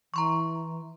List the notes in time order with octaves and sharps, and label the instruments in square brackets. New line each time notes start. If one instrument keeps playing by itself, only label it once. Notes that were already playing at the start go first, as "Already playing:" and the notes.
[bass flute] E3 [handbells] A#5 C6 C#6